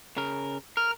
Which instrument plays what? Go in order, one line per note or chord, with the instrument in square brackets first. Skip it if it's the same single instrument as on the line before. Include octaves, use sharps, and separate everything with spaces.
[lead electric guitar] C#3 A#4
[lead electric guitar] A#4 [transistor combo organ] F6